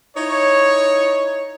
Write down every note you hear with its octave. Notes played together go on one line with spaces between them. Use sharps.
D#4 E4 C#5